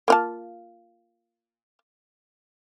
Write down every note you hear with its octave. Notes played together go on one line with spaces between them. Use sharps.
A#3 F4 A5